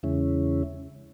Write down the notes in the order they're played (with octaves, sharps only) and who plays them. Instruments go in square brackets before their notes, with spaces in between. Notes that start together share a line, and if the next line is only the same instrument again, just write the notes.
[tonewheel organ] E2 C#3 G#3 C#4 E4